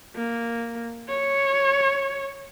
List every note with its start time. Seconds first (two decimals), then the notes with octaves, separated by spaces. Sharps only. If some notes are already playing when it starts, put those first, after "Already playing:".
0.16 A#3
1.09 C#5